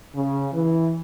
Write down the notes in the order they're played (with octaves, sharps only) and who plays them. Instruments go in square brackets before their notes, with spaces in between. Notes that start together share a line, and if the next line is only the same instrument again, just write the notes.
[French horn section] C#3
E3